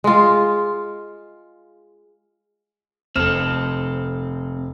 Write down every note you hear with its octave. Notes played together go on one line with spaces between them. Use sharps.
G#3 F4
F1 C4 A4 F6 E7